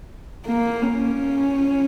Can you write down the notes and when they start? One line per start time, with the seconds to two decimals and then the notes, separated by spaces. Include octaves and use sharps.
0.46 A#3
0.82 C#4